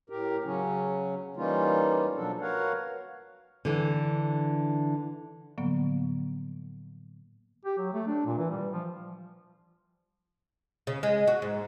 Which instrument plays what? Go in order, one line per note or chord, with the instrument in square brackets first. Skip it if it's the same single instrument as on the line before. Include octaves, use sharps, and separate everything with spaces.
[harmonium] A2 G4 A#4
C#3 F#3 C#4
E3 G3 A#3 C#4 D#4 F4
B2 F3 F#3 D4 A4
F#4 A#4 B4 C#5 F5 F#5
[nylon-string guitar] D3 E3
[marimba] A2 D3 F3 F#3 A#3 B3
[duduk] G4
F#3
A3
D4
A#2
E3
G3
F3
[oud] C#3
G#3
F#4
G#2